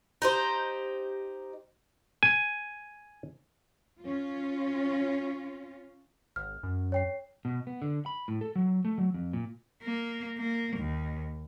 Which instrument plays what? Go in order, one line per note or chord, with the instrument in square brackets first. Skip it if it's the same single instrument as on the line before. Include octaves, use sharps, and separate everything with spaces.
[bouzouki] D#4 G4 C5
[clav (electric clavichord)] G#5
[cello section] C#4 F4
[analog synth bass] G#1 [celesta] F6
[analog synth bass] F#2
[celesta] C#5 G5 C7
[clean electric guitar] B2
B3
D3
B5
A2
A4
F#3
A3
F#3
F2
A#2
[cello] A#3
A#3
D#2